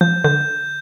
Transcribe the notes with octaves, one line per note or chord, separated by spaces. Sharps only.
F3 G6
D3 G6